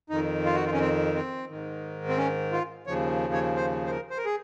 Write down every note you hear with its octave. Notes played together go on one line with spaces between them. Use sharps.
F2 D#3 D#4
F4
F#4
F4
C#4
C4
C4
G#2 D#3
C4
C#4
F4
D#2 C#3 F3 C#5
C#5
C5
C5
A#4
C5
A#4
G#4